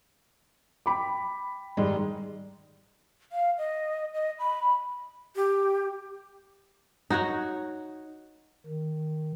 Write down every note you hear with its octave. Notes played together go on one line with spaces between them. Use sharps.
G5 B5 D6
G#2 D#3 G3 G#3
F5
D#5
D#5
B5
G4
D#4 F#4 C#5 F#5
D#3